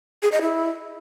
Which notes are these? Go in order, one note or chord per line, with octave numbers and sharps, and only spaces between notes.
G#4
D#5
E4